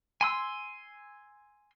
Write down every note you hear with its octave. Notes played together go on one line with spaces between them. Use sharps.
G#5 C6 E6